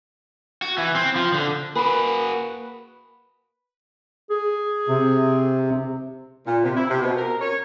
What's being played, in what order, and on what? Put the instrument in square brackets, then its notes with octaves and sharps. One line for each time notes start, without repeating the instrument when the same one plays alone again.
[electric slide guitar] F#4
E3
C4
F3
D3
[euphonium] A#3 [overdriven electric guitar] F#4 G#4 [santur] B4
[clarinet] G#4
[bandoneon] C3
[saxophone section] A#2
C3
E4
C3
B2
A#4
C#5